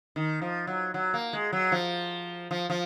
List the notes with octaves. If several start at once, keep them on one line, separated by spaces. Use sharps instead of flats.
D#3
F3
F#3
F#3
A#3
G#3
F#3
F3
F3
F3